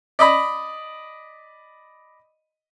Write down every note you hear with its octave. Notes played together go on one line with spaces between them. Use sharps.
D5 D#5 B5